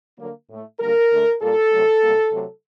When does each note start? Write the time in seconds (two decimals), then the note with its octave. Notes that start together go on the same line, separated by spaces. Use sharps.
0.19 D3 F#3 A#3
0.49 A2 A3
0.79 D3 G3 A#3 A#4
1.11 D3 A3
1.41 A#2 G3 A#3 A4
1.71 C3 F#3 A3
2.02 C3 G3 A#3
2.33 C3 F#3 A3